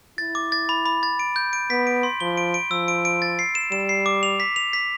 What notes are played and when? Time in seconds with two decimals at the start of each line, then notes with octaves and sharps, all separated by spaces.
0.18 E4 A6
0.35 D6
0.52 A6
0.69 B5
0.86 B5
1.03 A6
1.19 D7
1.36 G6
1.53 D7
1.70 B3 B6
1.87 D7
2.03 C6
2.20 F3 G7
2.37 D7
2.54 D7
2.71 F3 E6
2.88 D7
3.05 D7
3.22 A6
3.39 C7
3.55 E7
3.72 G3 E7
3.89 C7
4.06 D6
4.23 F7
4.40 B6
4.56 F7
4.73 B6